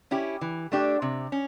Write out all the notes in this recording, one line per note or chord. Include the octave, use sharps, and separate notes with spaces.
C#4 E4 G4
E3
A3 D4 G4
C3
C#4